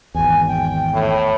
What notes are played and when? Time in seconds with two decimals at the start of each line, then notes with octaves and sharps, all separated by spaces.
0.15 G#1 E2 G#5
0.48 G5
0.94 A2